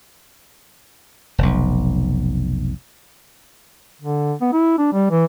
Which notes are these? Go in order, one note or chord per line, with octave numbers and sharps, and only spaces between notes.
F1 B1
D3
B3
E4
D4
G3
E3